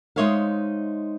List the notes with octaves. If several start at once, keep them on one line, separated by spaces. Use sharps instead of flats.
G#3 D#4 C5 C#5 E5 F5